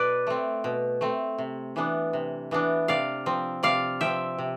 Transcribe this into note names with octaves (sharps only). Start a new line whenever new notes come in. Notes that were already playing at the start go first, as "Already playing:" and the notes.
Already playing: B2 B4 D5
A3 C4
B2
A3 C4
C3
E3 B3 D4
C3
E3 B3 D4
C3 D5 F5
F3 C4
C3 D5 F5
F3 C4 E5 G5
C3